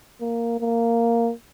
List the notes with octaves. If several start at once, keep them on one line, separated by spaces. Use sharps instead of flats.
A#3
A#3